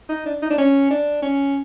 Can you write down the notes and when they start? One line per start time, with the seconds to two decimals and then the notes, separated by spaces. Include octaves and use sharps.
0.09 D#4
0.26 D4
0.42 D#4
0.50 D4
0.58 C#4
0.91 D4
1.22 C#4